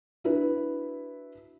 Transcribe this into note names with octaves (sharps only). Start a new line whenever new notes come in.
D4 E4 F#4 B4 E5